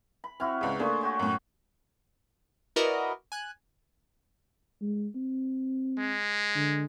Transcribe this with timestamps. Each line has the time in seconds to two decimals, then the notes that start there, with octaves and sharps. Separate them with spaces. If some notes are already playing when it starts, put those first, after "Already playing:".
0.24 B5
0.40 C4 E4 F#4 F6
0.61 C#2 C#3 F4 B4 D5
0.80 A3 A#3 D4 G#4 C6 C#6
1.01 F#4 G4 C#5
1.19 F#2 A2
2.76 E4 F#4 A#4 B4 D5 D#5
3.32 G#5 F#6
4.82 G#3
5.15 C4
5.98 G#3
6.56 D3